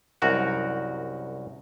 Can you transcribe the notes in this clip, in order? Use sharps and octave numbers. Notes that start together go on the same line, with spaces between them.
C2 F#2 D#4 F#4 A#4 F#5